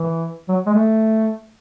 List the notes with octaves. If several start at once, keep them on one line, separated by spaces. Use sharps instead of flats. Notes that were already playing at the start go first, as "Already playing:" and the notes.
Already playing: E3
F#3
G#3
A3